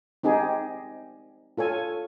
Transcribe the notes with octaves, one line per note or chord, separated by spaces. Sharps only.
C4 D#4 G4 G#4
F4 A4 C#5 G#5